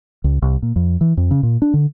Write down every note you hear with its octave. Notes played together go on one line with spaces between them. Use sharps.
C#2
C2
A#2
F2
E3
F2
C#3
A#2
D4
D3